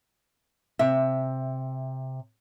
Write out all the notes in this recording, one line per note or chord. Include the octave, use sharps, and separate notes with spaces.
C3 E5